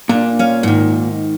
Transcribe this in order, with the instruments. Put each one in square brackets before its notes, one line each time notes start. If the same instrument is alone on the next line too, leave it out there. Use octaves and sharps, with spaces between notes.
[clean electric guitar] A#2 [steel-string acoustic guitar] D4
[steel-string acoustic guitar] C#4 F5
G#2 D#3